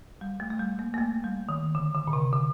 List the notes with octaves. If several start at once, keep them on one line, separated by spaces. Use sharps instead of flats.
G3
A3
A3
G3
A#3
A#3
A3
G3
D#3
D3
D3
A#2
C3
D3